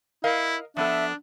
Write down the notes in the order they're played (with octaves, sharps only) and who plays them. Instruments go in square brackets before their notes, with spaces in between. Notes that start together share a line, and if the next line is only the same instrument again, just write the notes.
[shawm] E4 [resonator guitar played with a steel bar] A#4 D#5 F5
[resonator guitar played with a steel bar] F3 B3 A4 [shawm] D4 [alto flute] E5